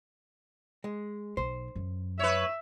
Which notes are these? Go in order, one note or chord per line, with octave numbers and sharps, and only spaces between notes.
G#3
B1 C5
F#2
B4 C#5 E5